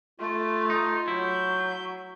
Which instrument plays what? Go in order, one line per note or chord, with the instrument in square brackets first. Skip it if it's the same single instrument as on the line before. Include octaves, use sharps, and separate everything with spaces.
[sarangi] A3 [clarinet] F4
[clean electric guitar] D#4
[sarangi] F#3 [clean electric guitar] E4 [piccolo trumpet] G6